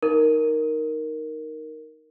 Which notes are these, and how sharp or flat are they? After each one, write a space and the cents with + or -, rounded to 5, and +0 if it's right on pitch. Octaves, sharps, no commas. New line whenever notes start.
D#4 +0 A#4 +0